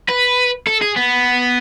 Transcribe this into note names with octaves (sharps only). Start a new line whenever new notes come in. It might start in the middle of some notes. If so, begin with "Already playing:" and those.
B4
A4
G#4
B3